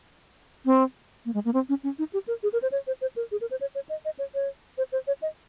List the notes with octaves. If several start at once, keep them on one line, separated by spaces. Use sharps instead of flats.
C4
A#3
G#3
A#3
C4
C#4
C#4
D#4
G4
A#4
G#4
A#4
C5
C#5
C5
C5
A#4
G#4
A#4
C5
C#5
C#5
D#5
D#5
C#5
C#5
C5
C5
C#5
D#5